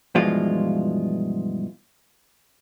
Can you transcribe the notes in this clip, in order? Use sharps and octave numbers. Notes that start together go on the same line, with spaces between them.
G2 B2 E3 F3 G#3 F4